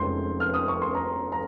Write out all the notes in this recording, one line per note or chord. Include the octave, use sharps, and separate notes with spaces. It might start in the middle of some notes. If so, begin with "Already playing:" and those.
Already playing: F1 F2 C#3 F3 G#3 C6 G6
F6
D#6
C#6
C6
A#5
A#5